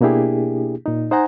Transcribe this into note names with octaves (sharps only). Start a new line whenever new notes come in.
B2 A#3 D4 E4 G4 G#4
A#2 D#4
D#4 C5 D#5 F#5 G#5 A#5